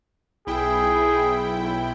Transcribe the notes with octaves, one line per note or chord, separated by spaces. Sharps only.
B1 E4 G#4 G5